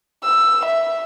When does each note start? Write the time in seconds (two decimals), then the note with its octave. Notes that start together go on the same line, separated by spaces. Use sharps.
0.24 E6
0.65 E5